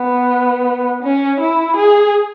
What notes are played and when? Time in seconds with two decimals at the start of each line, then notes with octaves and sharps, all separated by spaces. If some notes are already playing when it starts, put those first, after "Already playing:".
Already playing: B3
1.02 C#4
1.40 E4
1.76 G#4